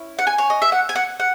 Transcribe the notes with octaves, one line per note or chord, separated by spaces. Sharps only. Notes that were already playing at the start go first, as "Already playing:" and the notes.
Already playing: C#4 E4
F#5
G#5
C#5
D#5
E5
F#5
G#5
F#5
F#5